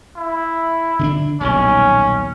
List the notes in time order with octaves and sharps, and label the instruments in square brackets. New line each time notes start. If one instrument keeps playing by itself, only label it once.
[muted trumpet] E4
[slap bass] D3 C#4 D4
[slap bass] D#1 B1 D#3 [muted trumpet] C#4